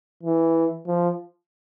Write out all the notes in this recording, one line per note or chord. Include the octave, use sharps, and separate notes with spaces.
E3
F3